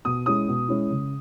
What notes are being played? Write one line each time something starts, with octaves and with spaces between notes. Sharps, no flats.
B2 D#6
G#3 C#4 E4 D#6
B2
G#3 C#4 E4
C#3